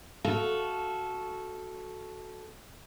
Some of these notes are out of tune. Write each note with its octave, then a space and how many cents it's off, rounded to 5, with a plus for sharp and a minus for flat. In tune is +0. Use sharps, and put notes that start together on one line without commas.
F#4 +0 A4 -10 F5 +0